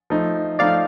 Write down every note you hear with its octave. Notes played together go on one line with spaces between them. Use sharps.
F3 A3 D#4
F3 A3 D#4 D5 F5